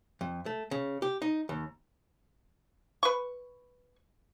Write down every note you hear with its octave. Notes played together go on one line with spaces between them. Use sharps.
F2
A3
C#3
G4
D#4
D#2
B4 C#6